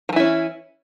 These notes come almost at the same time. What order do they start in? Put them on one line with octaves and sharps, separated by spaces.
F3 E3 E4 C#4